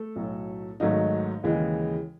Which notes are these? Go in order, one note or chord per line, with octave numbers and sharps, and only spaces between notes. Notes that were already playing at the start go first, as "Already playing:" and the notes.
Already playing: A3 A4
B1 A2 F#3
G#1 G#2 F#3 A3 D#4
D#2 C#3 E3 G#3